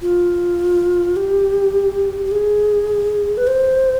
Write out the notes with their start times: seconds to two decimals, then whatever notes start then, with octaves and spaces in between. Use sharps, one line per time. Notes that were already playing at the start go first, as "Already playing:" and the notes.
0.02 F4
1.16 G4
2.25 G4
2.32 G#4
3.37 B4
3.47 C5